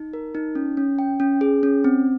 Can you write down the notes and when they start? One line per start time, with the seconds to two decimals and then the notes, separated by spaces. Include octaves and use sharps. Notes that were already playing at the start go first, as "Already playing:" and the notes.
Already playing: D#4
0.13 A#4
0.35 D#4
0.55 C#4
0.77 C#4
0.99 G5
1.20 C#4
1.41 G#4
1.63 C#4
1.84 C4